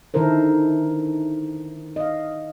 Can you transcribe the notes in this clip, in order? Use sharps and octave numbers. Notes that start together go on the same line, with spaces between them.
D3 D#3 E4 A4 A#4 C5
D#5 F5